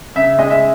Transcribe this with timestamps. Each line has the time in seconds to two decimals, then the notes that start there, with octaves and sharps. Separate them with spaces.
0.15 C#3 E5
0.38 G#3 D#5
0.50 E5